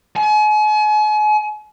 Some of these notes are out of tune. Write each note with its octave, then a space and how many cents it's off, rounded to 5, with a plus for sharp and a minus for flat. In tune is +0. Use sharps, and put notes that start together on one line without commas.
G#5 +40